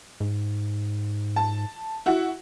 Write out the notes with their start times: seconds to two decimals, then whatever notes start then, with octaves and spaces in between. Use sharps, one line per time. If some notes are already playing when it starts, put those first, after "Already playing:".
0.20 G#2
1.36 A5
2.06 E4 F#4